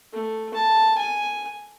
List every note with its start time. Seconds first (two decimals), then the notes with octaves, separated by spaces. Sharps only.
0.13 A3
0.54 A5
0.98 G#5